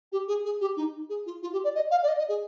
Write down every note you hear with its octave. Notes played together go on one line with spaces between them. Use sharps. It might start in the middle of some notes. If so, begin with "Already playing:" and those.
G4
G#4
G#4
G4
D#4
G#4
F4
F4
G4
D5
D#5
F5
D5
D#5
D#5
G#4